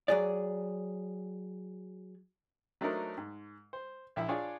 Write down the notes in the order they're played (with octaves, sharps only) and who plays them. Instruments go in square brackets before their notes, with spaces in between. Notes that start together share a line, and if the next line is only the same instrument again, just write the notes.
[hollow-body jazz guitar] F#3 G#4 D5
[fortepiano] F#3 A3 D4 D#4 A#4 C5
G#2
C5
A#1 E4 E5
D4 F4 G#4 C#5 D5